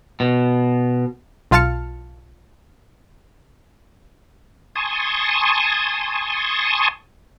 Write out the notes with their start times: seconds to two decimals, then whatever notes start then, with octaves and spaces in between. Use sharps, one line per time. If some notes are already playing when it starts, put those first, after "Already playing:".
0.20 B2
1.51 B1 F4 F5 A5 F6 C#7
4.75 G#5 A5 C6 C#6 D#6